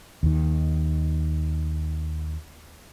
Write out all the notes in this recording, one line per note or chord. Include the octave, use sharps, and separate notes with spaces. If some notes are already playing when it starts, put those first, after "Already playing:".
D#2 D#3